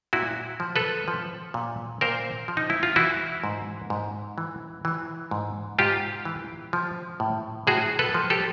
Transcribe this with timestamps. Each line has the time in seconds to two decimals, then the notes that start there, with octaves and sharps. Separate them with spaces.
0.13 A#2 E4 F#4
0.60 F3
0.76 A4 B4
1.08 F3
1.54 A#2
2.01 A#2 A#4 C5
2.48 F3
2.57 D#4
2.70 E4
2.83 F4
2.96 E3 E4 F#4
3.44 G#2
3.90 G#2
4.38 E3
4.85 E3
5.31 G#2
5.79 G#2 F4 G4
6.25 E3
6.73 F3
7.20 A2
7.67 A2 F#4 G#4
7.99 A4 B4
8.15 F3
8.30 G4 A4